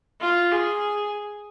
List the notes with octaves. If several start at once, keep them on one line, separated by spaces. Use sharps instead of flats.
F4
G#4